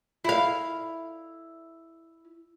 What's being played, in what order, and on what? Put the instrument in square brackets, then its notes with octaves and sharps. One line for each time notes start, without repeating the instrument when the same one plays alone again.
[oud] E4 F5